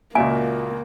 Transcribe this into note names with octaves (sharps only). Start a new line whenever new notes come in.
C#2 A#2 A#3 F4 F#4 E5 G#5